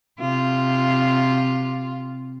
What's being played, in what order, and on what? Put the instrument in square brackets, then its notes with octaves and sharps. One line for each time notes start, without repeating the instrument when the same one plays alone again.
[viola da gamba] C3 F4